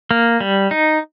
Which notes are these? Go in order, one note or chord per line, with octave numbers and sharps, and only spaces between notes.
A#3
G3
D#4